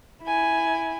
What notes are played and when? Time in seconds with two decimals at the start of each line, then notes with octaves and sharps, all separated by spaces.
0.23 E4 G#5